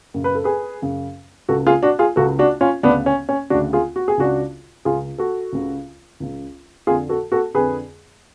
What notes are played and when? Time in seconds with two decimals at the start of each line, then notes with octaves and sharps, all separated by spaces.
0.14 F#2 C#3
0.24 B4
0.35 A4
0.44 G#4 B4
0.82 F#2 C#3
1.49 C#2 C#3 F#4 A4
1.67 F4 G#4
1.83 D4 F#4
1.99 F4 G#4
2.16 C#2 C#3 F#4 A4
2.39 D4 F#4
2.61 C#4 F4
2.83 D2 C#3 B3 D4
3.06 C#4
3.29 C#4
3.50 D2 C#3 D4 F#4
3.73 F4 G#4
3.96 F#4
4.08 G#4
4.18 C#2 C#3 D4 F#4
4.85 C#2 C#3 F4 G#4
5.18 F#4 A4
5.53 C#2 C#3
6.20 C#2 C#3
6.87 F2 D3 F4 G#4
7.09 F#4 A4
7.32 F#4 A4
7.54 F2 D3 G#4 B4